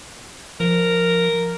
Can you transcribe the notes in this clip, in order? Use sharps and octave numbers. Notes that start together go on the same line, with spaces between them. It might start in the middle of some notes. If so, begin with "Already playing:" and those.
F3 A#4